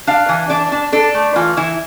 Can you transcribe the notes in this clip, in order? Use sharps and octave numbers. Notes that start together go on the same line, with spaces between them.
D4 F5
E3
D4 D5
D4
D4 A4
A3
E3 F4
E3 E4